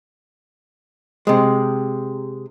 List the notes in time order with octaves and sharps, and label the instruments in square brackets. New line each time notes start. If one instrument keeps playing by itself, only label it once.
[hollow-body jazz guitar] C3 G#3